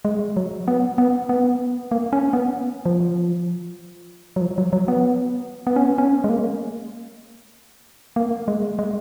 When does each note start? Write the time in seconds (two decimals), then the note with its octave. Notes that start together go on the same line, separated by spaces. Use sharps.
0.05 G#3
0.37 F#3
0.68 B3
0.98 B3
1.29 B3
1.91 A#3
2.13 C#4
2.33 B3
2.86 F3
4.36 F#3
4.41 F3
4.58 F#3
4.73 F#3
4.88 B3
5.67 B3
5.76 C#4
5.85 B3
5.98 C#4
6.24 G#3
6.29 A#3
8.16 A#3
8.48 G#3
8.79 G#3